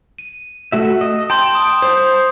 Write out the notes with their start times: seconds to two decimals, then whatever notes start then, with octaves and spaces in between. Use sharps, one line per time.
0.18 D#7
0.72 A3 F#4 E5
1.01 D#5
1.30 G5 A5 C6 G6
1.55 D#6
1.82 C5 D#6